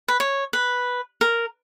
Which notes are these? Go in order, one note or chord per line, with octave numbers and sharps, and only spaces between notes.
B4
C#5
B4
A#4